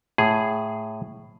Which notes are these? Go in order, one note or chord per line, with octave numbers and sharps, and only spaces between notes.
A2 G#4